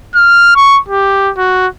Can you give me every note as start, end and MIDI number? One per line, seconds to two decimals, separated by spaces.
0.15 0.55 89
0.56 0.79 85
0.89 1.31 67
1.38 1.67 66